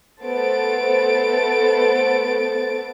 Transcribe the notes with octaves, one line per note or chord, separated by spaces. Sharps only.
A3 B3 A4 C5 A6 D7